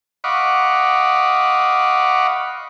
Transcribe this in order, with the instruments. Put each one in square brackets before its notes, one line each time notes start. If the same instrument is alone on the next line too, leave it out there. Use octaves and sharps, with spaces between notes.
[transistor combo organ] D#5 F5 F#5 B5 C#6 D6